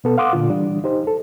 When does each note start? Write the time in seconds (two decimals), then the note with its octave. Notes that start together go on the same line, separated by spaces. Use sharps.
0.04 B2 B3 A4
0.18 F5 F#5 C6 D6 D#6
0.33 A#2 D3 F4
0.49 E3 G3 D4
0.84 D#4 G4 C5
1.07 A4